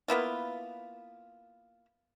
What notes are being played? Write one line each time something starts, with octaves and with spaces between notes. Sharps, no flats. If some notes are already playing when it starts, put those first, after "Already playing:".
A#3 B3 E4 F4